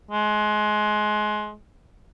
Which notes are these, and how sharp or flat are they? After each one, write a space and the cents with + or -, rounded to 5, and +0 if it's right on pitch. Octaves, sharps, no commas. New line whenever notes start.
G#3 +25